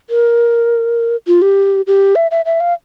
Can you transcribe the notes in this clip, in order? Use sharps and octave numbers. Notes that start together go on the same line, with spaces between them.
A#4
F4
G4
G4
E5
E5
E5
F5